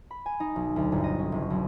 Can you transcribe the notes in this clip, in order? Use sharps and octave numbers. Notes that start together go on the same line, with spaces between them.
B5
G#5
D#4
B1
D2
G1
D#5
C#4
F#1
B1